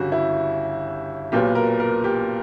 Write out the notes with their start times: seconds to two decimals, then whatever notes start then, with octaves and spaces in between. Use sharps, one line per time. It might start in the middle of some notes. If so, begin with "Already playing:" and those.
Already playing: G1 F#2 C#3 F#4 G4
0.12 E4
1.32 B1 A#2 F#3 B3 G4
1.55 A#4
1.80 A#4
2.04 G4